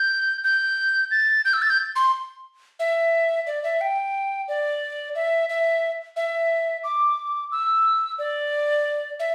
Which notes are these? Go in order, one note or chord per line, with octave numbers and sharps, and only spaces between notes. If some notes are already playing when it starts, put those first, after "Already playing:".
Already playing: G6
G6
A6
G6
E6
A6
G6
C6
E5
D5
E5
G5
D5
E5
E5
E5
D6
E6
D5
E5